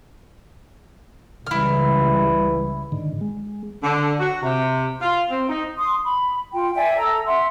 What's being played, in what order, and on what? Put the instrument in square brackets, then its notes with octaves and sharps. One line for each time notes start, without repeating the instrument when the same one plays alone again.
[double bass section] C#2 G3 [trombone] E3 [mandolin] E4 F6
[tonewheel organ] G#2 D3 D#3
G#3
[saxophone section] D3
F#4
C3
F4
C4
D#4
[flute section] C6 D#6
B5
F4 G5
D5 E5 G5 G#5
A4 A#5 E6
E5 F#5 C6